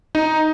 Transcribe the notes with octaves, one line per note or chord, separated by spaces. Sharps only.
D#4